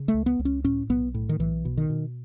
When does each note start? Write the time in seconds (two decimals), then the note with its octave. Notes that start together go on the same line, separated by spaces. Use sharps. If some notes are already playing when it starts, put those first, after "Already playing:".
Already playing: C#3
0.08 A3
0.14 C#2
0.26 B3
0.39 C#2
0.45 C#4
0.64 A2 C#4
0.89 B1 B3
1.14 A2
1.29 D#3
1.39 B1 E3
1.65 B2
1.77 D#3
1.90 B2